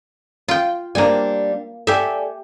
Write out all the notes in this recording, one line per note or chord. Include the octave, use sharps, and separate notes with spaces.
F4 G5
G3 A#3 C4 D4 G#5
G4 A4 D5 E5 G#5